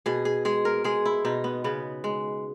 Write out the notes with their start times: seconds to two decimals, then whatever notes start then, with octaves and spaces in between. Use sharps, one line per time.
0.06 B2 G#4
0.25 G#4
0.45 G#3 G#4
0.65 A#4
0.84 G#3 G#4
1.05 E4
1.25 B2 D#4
1.44 B3
1.64 C#3 B3
2.04 G#3